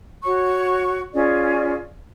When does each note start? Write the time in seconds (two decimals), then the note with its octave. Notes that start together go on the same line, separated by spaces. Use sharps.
0.23 F#4 C#5 C#6
1.13 C#4 F4 G#4 D5